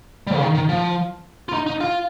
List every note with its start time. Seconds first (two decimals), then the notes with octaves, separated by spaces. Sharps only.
0.27 G3
0.35 C#3
0.41 D#3
0.55 D#3
0.69 F3
1.49 F4
1.54 D#4
1.67 D#4
1.81 F4